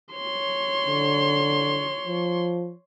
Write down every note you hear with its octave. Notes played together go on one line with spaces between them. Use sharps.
C#5 C6
D3
F3